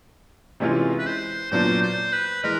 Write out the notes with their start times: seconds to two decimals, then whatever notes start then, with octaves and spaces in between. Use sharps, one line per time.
0.60 C3 E3 G#3 C#4 F4
0.98 B4
1.06 C5
1.51 A#2 F#3 B3 D4 F4 C5
1.82 C5
2.12 B4
2.43 E3 G#3 A#4